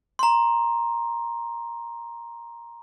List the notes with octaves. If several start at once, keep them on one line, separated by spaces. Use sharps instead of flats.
A#5 C6